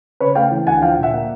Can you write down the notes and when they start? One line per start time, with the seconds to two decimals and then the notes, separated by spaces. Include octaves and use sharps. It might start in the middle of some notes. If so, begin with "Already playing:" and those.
0.20 C#3 B4 C#5
0.35 A3 F5 G5
0.51 E3
0.66 D2 F#5 G#5
0.82 F3 F5 G5
0.97 A#2
1.03 E5 F#5
1.13 A#3